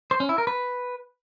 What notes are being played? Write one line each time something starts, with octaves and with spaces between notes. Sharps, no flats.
C5
C#4
E4
A#4
B4